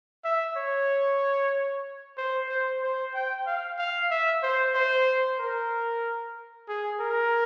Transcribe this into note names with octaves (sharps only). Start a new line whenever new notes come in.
E5
C#5
C5
C5
C5
G5
F5
F5
E5
C5
C5
A#4
G#4
A#4